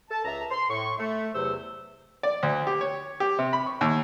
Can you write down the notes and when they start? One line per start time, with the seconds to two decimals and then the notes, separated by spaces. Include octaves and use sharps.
0.10 A4 A5
0.24 C#2 E5 A#5
0.50 C6
0.70 A2 C#6
0.98 A3
1.33 E2 C3 F#3 C5 E6
2.23 D5
2.43 D2
2.67 G4
2.81 C#5
3.20 G4
3.39 C3
3.53 B5
3.66 C#6
3.81 D#2